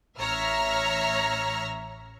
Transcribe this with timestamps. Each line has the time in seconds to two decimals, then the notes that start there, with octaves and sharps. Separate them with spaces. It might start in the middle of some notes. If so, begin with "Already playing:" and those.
0.19 A1 C#5 E5 A#5 E6 F6